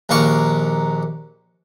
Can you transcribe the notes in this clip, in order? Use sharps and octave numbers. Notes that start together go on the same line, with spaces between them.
A#1 D#2 A#3 A#4 C#6